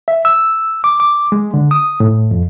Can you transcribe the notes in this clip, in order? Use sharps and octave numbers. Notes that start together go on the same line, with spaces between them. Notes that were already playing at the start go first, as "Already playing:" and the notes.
E5
E6
D6
D6
G#3
D3
D#6
A2
F2